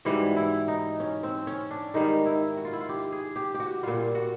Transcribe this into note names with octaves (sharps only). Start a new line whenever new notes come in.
G#2 E3 G3 F#4
E4
D#4
C#4
C4
C#4
D4
G#2 D#3 G3 D#4
E4
F#4
F4
E4
F4
G4
G#4
G4
G4
F#4
A#2 G3 F4
F#4